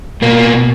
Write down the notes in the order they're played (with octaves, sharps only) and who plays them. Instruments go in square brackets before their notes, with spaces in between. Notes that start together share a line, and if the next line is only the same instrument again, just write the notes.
[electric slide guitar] B2 A#3